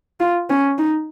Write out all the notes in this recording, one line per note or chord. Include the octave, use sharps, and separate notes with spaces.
F4
C#4
D#4